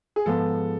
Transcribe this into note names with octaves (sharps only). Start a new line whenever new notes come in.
G#4
G#2 F3 G#3 B3 A4